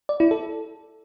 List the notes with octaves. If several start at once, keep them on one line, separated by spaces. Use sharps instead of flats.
D5
E4
A4